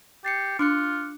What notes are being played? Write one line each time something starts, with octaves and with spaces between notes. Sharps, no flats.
G4 A6 C7 C#7
D4 F4 D6 F#6 C#7